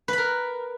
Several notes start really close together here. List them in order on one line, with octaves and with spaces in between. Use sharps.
B4 B5 A#4